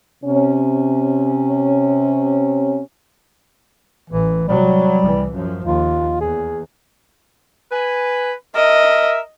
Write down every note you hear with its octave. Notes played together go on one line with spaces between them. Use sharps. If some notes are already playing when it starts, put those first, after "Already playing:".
C3 C#4
A1 E3
C3 F#3 G3
C2 E3
F#2 F3
D#2 F4
E2 G#4
B4 G#5
A#4 D#5 E5